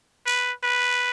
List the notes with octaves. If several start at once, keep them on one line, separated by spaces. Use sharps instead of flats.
B4
B4